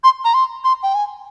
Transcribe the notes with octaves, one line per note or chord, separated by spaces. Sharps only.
C6
A#5
C6
C6
G5
G#5